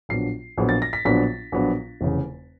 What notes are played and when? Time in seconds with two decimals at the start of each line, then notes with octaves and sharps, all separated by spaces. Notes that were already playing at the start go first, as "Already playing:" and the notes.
0.09 A#1 A#2 F#3 B3 D4 C7
0.58 A#1 A#2 F#3 B3 D4
0.69 A6
0.82 A#6
0.93 B6
1.05 A#1 A#2 F#3 B3 D4 B6
1.52 A#1 A#2 F#3 B3 D4
2.01 F1 E2 C#3